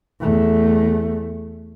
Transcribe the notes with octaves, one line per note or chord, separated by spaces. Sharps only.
E2 A3